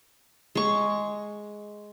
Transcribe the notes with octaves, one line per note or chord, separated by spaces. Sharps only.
G#3 C#6